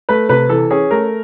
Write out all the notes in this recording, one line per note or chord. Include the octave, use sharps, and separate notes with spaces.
A3 B4
C3 B4
E3 A4
C#4 G#4
A3 A#4